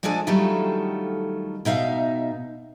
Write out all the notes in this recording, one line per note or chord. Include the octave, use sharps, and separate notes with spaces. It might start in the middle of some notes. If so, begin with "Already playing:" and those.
F3 G#3 D4 G#4 A4 G#5
D#3 F#3 G3 A3 F4 A4
B2 D#4 E5 F5